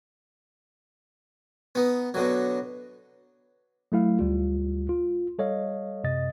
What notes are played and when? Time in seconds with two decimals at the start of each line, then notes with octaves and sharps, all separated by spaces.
1.75 B3 D#4
2.14 B2 D3 F#3
3.92 F#3 A3 E4 F5
4.19 D2 G3 F4
4.89 F4
5.38 G3 A4 C#5 D#5 F5
6.04 F#2 C3 D#5 A6